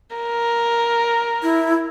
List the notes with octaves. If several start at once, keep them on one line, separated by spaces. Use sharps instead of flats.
A#4
E4